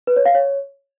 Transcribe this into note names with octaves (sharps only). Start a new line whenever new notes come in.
B4
C#5
F5
C#5